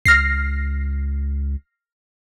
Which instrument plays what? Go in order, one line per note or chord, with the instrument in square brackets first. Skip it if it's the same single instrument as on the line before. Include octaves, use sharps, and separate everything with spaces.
[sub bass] C#2 [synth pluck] F6 A#6 C7